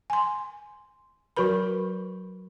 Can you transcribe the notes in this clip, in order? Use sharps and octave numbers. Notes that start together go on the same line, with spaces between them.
G#5 C6
F#3 F#4 A#4 B4 B5